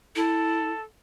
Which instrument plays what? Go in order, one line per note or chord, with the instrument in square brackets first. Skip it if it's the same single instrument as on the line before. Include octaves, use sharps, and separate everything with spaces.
[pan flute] E4 [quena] A4